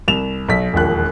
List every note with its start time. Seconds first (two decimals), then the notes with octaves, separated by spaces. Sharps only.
0.08 C2 E7 F7
0.49 B1 B6
0.73 E1 A#1 D#2 F#6